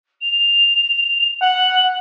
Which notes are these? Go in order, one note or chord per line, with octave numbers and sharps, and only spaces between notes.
F7
F#5 F#7